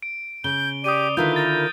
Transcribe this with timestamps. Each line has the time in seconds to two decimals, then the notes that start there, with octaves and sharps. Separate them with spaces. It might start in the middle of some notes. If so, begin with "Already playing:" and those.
0.02 D7
0.44 C#3 G6 G7
0.84 G4 D5 D#6 D#7
1.17 D3 D#3 E4 F4 B4 G6
1.36 A#4 A6